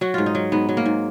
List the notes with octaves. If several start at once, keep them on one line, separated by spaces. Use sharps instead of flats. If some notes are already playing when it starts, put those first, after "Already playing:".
F#3 F#4
G#2 F4
D#4
F#3
G#2 B3
F#3
A#3
G#2